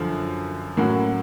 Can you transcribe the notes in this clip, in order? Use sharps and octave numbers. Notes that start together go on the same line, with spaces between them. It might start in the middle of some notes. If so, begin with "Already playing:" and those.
Already playing: F#2 D3 F3
A2 F#3 A#3 C#4 F#4